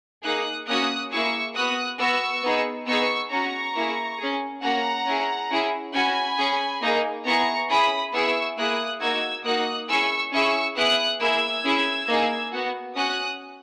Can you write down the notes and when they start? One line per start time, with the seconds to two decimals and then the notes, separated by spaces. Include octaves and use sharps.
0.23 A#3 D#4 G#4 D#6 F#6
0.67 A#3 C#4 F#4 D#6 F#6
1.11 A#3 E4 G#4 C#6 E6
1.55 B3 F#4 D#6 F#6
1.99 B3 F#4 C#6 E6
2.43 B3 D#4 G#4
2.87 B3 D#4 G#4 C#6 E6
3.31 C#4 F#4 A#5 C#6
3.75 A#3 E4 G#4
4.18 C#4 G#4
4.62 A#3 C#4 F#4 F#5 A#5
5.06 C#4 E4 G#4
5.50 C#4 E4 G#4
5.93 C#4 F#4 G#5 B5
6.38 C#4 G#4
6.81 A#3 D#4 G#4
7.25 B3 E4 G#4 A#5 C#6
7.69 C#4 E4 G#4 B5 D#6
8.13 B3 E4 G#4 C#6 E6
8.57 A#3 E4 G#4 D#6 F#6
9.00 A#3 D#4 F#4 E6 G#6
9.45 A#3 D#4 F#4 D#6 F#6
9.88 C#4 E4 G#4 C#6 E6
10.32 C#4 E4 G#4 C#6 E6
10.76 B3 E4 G#4 D#6 F#6
11.20 A#3 E4 G#4 E6 G#6
11.64 C#4 E4 G#4
12.08 A#3 D#4 G#4
12.52 B3 F#4
12.96 C#4 F#4 D#6 F#6